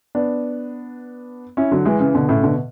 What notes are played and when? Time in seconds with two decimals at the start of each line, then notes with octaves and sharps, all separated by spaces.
0.15 B3 D4
1.57 C#4 E4
1.71 D3 F#3
1.85 E3 G#3
2.00 C#3 E3
2.15 B2 D3
2.29 A2 C#3
2.43 B2 D3